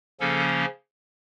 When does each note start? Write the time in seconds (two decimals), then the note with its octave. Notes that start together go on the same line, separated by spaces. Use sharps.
0.20 C#3 F3 A#3 C#4 A4